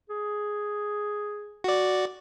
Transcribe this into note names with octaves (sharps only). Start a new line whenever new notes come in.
G#4
F#4 D5